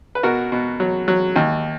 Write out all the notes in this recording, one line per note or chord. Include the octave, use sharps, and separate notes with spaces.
B4
B2 F#4 A#4
B2
F#3
F#3
D#2